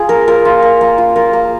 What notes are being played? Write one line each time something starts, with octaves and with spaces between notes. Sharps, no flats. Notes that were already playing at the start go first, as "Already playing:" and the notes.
Already playing: F4 G#4
A#3 A#4
F4 A#4
F4
A#3
A#3
F4
F4 A#4
A#3